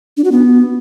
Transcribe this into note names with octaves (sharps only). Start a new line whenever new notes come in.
D4
F#4
B3